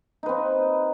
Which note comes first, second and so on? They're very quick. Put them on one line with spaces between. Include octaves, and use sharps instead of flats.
D#4 B4 C4